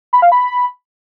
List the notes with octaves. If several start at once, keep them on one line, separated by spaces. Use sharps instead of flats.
B5
F5
B5